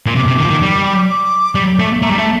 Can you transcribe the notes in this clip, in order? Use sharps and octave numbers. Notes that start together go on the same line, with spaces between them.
A#2
C3 D6
C3
D#3
F3
D#3
G3
D6
G3 D6
A3
A3 A#5
G3
A3 A5